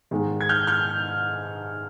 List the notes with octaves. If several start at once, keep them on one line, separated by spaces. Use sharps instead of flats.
G#2 D#3 G#3
G#6
F6 G6
F6 G6